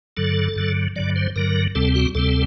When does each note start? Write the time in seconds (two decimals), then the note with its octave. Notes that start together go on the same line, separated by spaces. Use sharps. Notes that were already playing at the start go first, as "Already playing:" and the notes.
0.17 G2 D3 F#3 A4
0.56 G2 D3 F#3
0.96 G2 D3 F#3 D5
1.16 C5
1.36 G2 D3 F#3 A#4
1.75 D2 C3 G3 C4 A4
1.95 F#4
2.15 D2 C3 G3 C4 A4